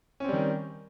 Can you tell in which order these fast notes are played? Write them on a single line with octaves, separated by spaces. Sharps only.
C#4 C4 G3 D#3